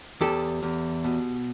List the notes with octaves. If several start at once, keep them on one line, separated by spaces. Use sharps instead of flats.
E2 G4 A4
E2
B2